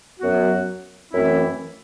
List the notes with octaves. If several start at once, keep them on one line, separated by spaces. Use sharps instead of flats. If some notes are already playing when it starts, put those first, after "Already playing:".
F#2 F#3 B3 F#4
F#2 E3 A3 C4 E4